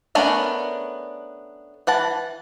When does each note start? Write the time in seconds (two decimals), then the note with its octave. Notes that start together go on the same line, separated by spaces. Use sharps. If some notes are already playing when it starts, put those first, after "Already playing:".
0.15 A3 B3 C#4 D4 A#4
1.87 E3 F#5 A5